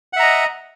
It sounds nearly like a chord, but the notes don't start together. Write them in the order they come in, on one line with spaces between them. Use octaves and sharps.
F#5 E5 A#5 D#5